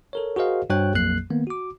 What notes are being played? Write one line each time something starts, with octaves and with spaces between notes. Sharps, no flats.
A4 A#4 C#5
F#4 G#4 A#4 C5 D#5 F5
G2 F#4 C5 C#5 G5 F#6
A#1 F2 F#3 A#3 F#6 C7
D#3 A#3 B3
F#4 D6